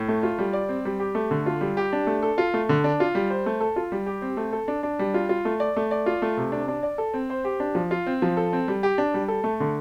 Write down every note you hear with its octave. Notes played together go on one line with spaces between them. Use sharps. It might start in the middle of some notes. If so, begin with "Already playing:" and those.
Already playing: A2
A3
F4
G3
D5
C4
G3
G4
A3
D3
F4
G3
G4
D4
A3
A4
F4
A3
D3
D4
F4
G3
C5
A3
A4
F4
G3
G4
C4
A3
A4
D4
D4
G3
F4
F4
A3
D5
A3
D5
F4
A3
C3
D4
D4
D5
A4
C4
C5
G4
D4
F3
F4
C4
F3
A4
C4
G3
G4
D4
G3
A4
A3
D3